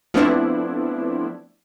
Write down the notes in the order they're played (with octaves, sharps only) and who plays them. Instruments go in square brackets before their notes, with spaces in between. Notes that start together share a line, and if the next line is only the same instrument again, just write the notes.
[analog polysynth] F3 A3 B3 C4 D4 E4